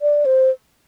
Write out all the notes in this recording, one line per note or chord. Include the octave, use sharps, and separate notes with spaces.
D5
C5